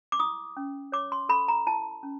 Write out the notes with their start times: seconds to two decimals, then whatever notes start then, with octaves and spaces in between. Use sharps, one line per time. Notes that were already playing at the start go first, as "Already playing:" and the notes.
0.12 D6
0.20 E4 D#6
0.57 C#4
0.92 C#5 D6
1.12 C6
1.29 A4 B5
1.48 A#5
1.67 E4 A5
2.03 C#4